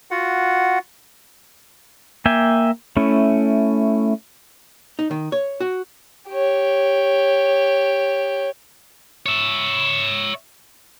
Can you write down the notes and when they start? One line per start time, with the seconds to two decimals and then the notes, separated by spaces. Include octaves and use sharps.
0.11 F4 F#4 F#5
2.26 A#3 E5 G5 G#5
2.97 A3 C#4 E4
4.99 D#4
5.11 D#3
5.32 C#5
5.61 F#4
6.29 G4 C#5
9.26 C#5 E5